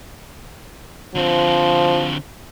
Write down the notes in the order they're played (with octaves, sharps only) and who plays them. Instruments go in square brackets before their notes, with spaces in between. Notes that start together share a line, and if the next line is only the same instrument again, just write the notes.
[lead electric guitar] D3 C4 [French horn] F3